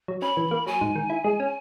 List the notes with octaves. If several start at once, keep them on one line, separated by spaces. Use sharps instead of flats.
F#3
C#4 B5
E3
A#3
F#3 G#5
G#2
D#3
E4
G#3
C#4